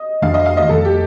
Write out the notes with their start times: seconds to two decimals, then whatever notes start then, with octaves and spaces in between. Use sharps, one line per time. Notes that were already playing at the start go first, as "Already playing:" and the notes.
Already playing: D#5
0.22 F2 D#3 A3 D4 F5
0.34 D#5
0.46 F5
0.57 D#5
0.69 F2 D#3 A3 A4
0.85 G4